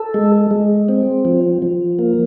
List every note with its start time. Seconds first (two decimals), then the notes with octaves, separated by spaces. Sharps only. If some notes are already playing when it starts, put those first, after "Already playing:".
Already playing: A4
0.14 G#3
0.51 G#3
0.89 C4
1.25 F3
1.62 F3
1.99 A#3